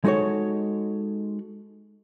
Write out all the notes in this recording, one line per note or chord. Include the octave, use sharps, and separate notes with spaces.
G#3 D#4 F#4 A4 C#5